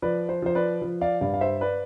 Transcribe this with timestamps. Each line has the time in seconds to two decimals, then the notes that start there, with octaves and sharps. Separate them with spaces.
0.02 F3 B4 D5
0.29 C5
0.42 F3 C5
0.55 B4 D5
0.82 F3
1.01 D5 F5
1.21 G2 D5 F5
1.34 F5
1.41 C5 E5
1.61 B4 D5